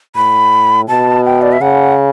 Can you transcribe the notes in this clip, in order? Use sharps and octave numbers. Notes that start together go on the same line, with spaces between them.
A2 B5
B2 A5
G5
D5
E5
C#3 F#5